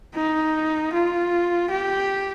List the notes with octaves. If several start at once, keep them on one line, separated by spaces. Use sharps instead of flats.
D#4
F4
G4